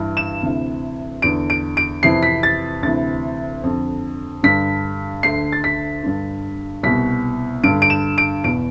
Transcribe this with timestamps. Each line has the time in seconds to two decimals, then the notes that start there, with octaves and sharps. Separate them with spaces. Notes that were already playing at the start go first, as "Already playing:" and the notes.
Already playing: G2 E3
0.17 E7
0.43 D2 C3 E3
1.22 E2 D3 D7
1.50 D7
1.77 D7
2.03 F2 C3 E3 C7
2.23 B6
2.43 A6
2.83 D2 C3 E3 A6
3.64 F2 D3
4.43 G2 D3 B6
5.23 D2 D3 C7
5.52 A6
5.64 B6
6.03 G2 D3
6.83 C2 B2 B6
7.64 G2 D3 D7
7.82 D7
7.90 E7
8.18 D7
8.44 E2 B2 D7